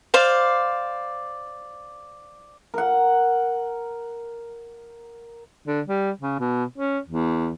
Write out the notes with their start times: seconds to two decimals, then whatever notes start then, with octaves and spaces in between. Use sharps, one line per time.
0.14 C5 D5 F5
2.74 A#4 F#5
5.67 D3
5.87 G3
6.20 C#3
6.40 B2
6.78 C#4
7.08 E2